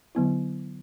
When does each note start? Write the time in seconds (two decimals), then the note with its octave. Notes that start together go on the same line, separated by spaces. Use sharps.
0.15 D3 F#3 B3 E4